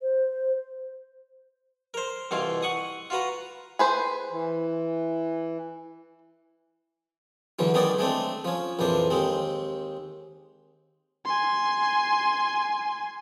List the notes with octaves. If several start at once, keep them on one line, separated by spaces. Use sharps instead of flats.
C5
A#4 C5
C2 B2 E3 F4 C6
F#5 C#6 D#6
F4 F#4 B4 A#5
G#4 B4 C5
E3
E2 D3 E3 F#3
D#3 G#3 B3 C#4 D#4 D5
G#3 A3 C4 D4
F3 C#4
A#1 F2 E3 D4 C5
D#2 G#3 C4
G#5 C6